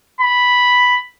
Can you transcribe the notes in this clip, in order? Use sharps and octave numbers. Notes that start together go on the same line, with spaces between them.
B5